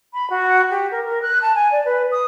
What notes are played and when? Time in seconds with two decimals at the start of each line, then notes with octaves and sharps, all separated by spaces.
0.14 B5
0.30 F#4
0.70 G4
0.91 A#4
1.06 A#4
1.22 F#6
1.42 A5
1.55 G#5
1.72 D5
1.85 B4
2.11 D#6